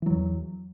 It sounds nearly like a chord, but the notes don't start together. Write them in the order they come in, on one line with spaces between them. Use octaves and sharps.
E3 F#3 E2